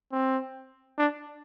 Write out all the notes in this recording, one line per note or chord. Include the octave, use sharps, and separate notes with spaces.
C4
D4